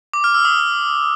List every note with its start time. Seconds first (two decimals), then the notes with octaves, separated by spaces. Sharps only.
0.13 D6
0.24 F6
0.34 E6
0.45 D#6